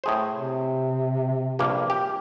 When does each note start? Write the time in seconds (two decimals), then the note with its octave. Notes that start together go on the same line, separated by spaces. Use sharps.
0.04 A2 G#4 C5
0.34 C3
1.59 A#1 G2 A#3
1.90 G4